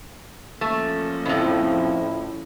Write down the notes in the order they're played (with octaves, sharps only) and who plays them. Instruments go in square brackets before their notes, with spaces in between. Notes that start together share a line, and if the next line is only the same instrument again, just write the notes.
[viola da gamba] F3 A#3 C#4 [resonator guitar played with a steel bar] A3
[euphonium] F2 [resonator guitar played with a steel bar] A2 C#3 [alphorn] E4